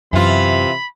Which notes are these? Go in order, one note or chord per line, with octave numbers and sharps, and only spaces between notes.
F#2 C3 E3 F4 B5